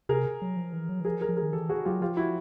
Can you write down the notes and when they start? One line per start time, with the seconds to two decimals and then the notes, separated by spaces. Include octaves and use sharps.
0.09 C3 G#4 A#4
0.42 F#3
0.57 F3
0.73 E3
0.89 F#3
1.00 E3
1.05 F3 G#4 A#4
1.21 G#4 A#4
1.29 F3
1.37 G#4 A#4
1.43 D#3
1.53 E3 G4 A4
1.70 F#4 G#4
1.85 F#3 F4 G4
2.01 F3 F4 G4
2.17 E4 F#4